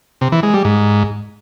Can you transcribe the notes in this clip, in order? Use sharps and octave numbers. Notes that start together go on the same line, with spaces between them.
C3
E3
G#3
G3
G#2